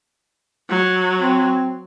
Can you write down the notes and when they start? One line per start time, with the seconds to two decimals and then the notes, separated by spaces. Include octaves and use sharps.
0.70 F#3
1.20 C4